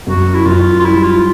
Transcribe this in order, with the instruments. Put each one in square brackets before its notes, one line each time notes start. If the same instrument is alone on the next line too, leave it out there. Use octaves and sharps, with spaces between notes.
[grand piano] F#2 [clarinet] F#4
[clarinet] E4
[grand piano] F#2 [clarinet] F4
[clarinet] F4
[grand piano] G3 [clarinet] E4
[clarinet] F4